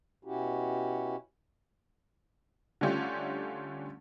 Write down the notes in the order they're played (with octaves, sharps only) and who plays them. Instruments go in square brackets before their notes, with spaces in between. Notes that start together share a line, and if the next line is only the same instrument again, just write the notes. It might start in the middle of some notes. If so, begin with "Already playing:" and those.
[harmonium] B2 C#4 E4 F#4 G4
[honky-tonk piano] D3 G3 A3 C#4 F4 G4